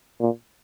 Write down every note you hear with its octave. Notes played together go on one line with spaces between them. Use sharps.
A#2